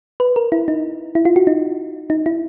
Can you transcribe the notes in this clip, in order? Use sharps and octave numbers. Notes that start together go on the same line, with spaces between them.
B4
A#4
E4
D#4
E4
F4
F#4
D#4
D#4
E4